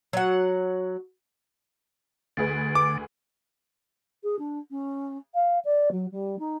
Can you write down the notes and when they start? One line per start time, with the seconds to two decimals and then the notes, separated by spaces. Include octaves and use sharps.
0.13 F#3 F#5
2.37 D2 D3 G#4 B4
2.75 D6
4.23 G#4
4.39 D4
4.71 C#4
5.34 F5
5.65 D5
5.92 F#3
6.12 G3
6.39 D#4